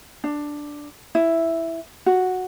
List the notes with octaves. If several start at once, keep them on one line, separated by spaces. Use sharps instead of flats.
D4
E4
F#4